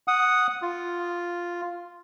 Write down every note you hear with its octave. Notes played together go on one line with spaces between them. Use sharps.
F#5 D#6
F4